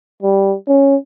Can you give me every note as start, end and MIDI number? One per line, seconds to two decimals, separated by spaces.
0.23 0.55 55
0.68 0.95 61